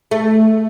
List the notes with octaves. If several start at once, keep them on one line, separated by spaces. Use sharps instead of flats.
A3